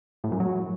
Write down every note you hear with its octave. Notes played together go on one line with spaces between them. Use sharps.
A2
F#2
F#3